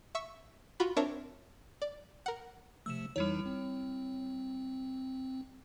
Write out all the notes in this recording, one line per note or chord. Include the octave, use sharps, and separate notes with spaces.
E5 C#6 E6
F4 F#4 B5
C4 D4 A#4 C#5 E5 A5
D5
A#4 F#5
C3 F3 A3 E6 E7
F2 E3 G3 D#4 E4 C#5
C4